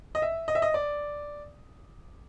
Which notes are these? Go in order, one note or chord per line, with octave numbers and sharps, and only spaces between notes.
D#5
E5
D#5
E5
D#5
D5